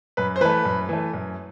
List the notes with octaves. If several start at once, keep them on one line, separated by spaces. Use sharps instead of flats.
F#2 B4
C5
E3 A3 B4
F#2
E3 A3
F#2